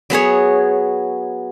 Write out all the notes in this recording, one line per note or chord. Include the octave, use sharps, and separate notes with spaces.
F#3 B3 G#4 C#5